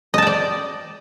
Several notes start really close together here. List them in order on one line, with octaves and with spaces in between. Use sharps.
D#5 A5 G5 D5